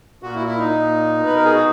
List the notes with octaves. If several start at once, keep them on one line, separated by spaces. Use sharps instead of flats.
A#2 F#4
E4
E4
D#4
A#2
B2
B4
A#4
G#4
F#4